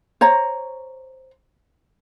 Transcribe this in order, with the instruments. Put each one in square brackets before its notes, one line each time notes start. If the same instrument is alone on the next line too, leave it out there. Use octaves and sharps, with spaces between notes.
[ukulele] C5 C#5 A#5